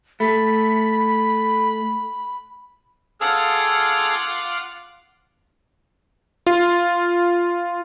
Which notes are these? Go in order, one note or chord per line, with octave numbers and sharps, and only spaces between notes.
A3 B5
F4 G#4 A4 F5 F#5 D6
F4